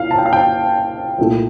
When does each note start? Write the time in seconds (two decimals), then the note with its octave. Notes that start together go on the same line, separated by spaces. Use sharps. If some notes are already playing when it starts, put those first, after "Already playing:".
Already playing: C2 A#2 F5
0.11 A5
0.18 G5
0.26 F5
0.33 G5
1.19 C2 A#2 A3